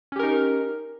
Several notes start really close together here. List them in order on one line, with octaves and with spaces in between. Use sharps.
C#4 G4 A#4 D#4